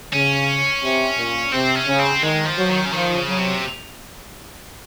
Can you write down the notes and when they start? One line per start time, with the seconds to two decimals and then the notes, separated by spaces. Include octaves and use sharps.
0.13 C#3 C#4
0.82 C3
1.18 A#2
1.52 C3 C4
1.75 C#4
1.87 C#3
1.99 C4
2.22 D#3 G#3
2.45 F3
2.57 F#3
2.69 D#3
2.86 C#3
2.93 D#3 F3
3.15 C#3
3.28 F#3
3.38 C3